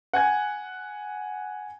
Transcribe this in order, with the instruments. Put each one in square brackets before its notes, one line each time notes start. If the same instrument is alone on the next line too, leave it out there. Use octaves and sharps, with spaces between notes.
[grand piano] F#5 G#5 G#6